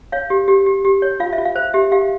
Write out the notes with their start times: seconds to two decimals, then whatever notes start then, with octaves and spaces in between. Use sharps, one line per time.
0.12 C#5 F5
0.30 G4
0.48 G4
0.66 G4
0.85 G4
1.02 C#5
1.20 F4 F5
1.33 E5
1.38 F4
1.45 F5
1.56 C5
1.74 G4 E5
1.92 G4 F5